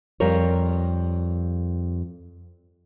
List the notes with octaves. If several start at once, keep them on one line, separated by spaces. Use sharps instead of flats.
F2 G3 A#4 C#5